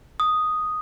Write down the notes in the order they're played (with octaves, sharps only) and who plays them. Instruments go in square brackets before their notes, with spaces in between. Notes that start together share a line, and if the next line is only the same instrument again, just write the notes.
[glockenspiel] D#6